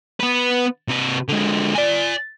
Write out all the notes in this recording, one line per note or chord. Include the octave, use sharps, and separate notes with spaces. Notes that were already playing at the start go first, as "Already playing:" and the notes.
B3 B4
C3 B4
D3 G#3
D5 G#5